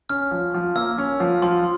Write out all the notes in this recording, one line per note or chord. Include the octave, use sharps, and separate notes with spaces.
C#4 F6
F3
F3
A#3 E6
C#4
F3
F3 C6